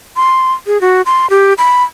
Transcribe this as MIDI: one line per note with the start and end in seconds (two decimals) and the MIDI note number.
0.16 0.53 84
0.67 0.80 68
0.81 1.02 66
1.06 1.29 84
1.30 1.53 67
1.58 1.83 83